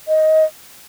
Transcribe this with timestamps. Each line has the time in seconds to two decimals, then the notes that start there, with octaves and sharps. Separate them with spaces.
0.08 D#5